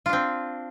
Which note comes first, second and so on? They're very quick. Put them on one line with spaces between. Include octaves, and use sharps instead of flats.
F4 D4 C4